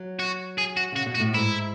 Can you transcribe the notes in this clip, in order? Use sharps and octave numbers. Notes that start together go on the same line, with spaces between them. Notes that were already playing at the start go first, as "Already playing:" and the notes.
Already playing: F#3
F#4
G#4
F#4
C#3 F#4
B2
F#4
A2
G#2 E4